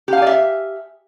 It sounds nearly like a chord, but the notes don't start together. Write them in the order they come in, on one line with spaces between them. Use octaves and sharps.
G4 F5 G#5 D5 E5